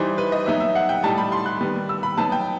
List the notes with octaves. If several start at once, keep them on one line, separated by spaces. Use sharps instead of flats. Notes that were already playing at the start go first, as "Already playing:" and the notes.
Already playing: E3 G3 D#4 C5
B4
D#5
F#3 B3 D#4 E5
E5
F#5
G5
A2 G3 D#4 A5
B5
C6
F#6
D#3 G3 B3
E6
B5
F#3 B3 D#4 A5
G5